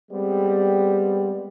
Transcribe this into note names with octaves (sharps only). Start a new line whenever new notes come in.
G3 G#3 B3 C4